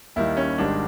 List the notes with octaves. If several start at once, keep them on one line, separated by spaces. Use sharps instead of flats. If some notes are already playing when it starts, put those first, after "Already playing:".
D#2 D#3 G3 E4
C#4
G#1 G#2 D#3 G3 D4